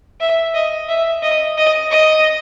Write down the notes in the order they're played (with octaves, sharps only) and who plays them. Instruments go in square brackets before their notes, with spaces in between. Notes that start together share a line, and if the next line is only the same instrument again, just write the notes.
[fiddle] E5
D#5
E5
D#5
D#5
D#5